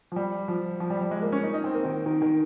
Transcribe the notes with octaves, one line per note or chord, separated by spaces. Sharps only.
F3
G3
F3
F3
G3
G3
G#3
A#3
C#4
D#4
D#4
C4
A#3
D#3
D#3
D#3